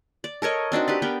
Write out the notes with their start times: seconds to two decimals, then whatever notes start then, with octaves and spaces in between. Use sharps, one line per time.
0.24 D5
0.42 A4 A#4 C#5 D#5
0.72 C4 D4 D#4 F#4
0.88 G4 B4 D5
1.02 B3 A#4 D5 G5